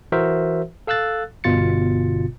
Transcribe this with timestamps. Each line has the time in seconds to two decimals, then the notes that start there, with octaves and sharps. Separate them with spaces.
0.12 E3 F#4 A#4 C5 E5
0.87 A4 F5 E6 F#6 A6
1.44 G1 B2 F4 A6 C#7